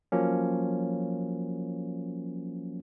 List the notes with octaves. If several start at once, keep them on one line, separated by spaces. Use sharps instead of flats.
F3 F#3 A#3 C#4